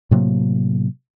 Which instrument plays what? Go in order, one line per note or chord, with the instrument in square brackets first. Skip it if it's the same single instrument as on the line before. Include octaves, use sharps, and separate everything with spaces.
[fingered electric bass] A2 C3 F#3 A#3